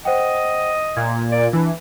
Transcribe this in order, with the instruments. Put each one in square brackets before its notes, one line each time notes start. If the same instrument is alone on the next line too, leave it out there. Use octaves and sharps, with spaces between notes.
[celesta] C5 F#5 G5 [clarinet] D#5
[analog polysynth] A#2 [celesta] G#6
[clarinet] D5
[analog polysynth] E3 [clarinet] D4